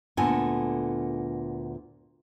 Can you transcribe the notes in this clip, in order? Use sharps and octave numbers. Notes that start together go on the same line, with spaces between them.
D2 A#2 B3 A4 G#5